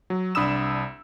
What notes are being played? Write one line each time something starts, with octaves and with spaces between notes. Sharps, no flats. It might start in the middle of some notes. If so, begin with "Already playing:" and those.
F#3
C2 D4 B5 D#6 E6 E7